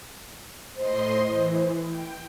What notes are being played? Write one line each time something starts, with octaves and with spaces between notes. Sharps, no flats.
A2 C5 D#5 C6
E3
G5